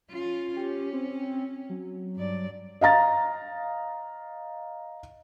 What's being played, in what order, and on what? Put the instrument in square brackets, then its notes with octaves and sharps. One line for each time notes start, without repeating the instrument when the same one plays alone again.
[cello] C#4 F4
[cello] C#4 [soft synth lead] G4
[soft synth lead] C4
F#3
[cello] G2 D5
[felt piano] D#5 F5 A#5 A6